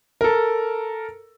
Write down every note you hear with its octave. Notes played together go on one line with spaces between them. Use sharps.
A4 A#4